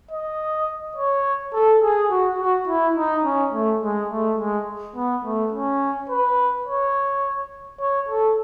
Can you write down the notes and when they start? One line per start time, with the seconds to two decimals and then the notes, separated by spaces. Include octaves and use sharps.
0.11 D#5
0.96 C#5
1.54 A4
1.82 G#4
2.11 F#4
2.38 F#4
2.68 E4
2.96 D#4
3.24 C#4
3.53 A3
3.81 G#3
4.10 A3
4.38 G#3
4.95 B3
5.24 A3
5.52 C#4
6.09 B4
6.66 C#5
7.80 C#5
8.09 A4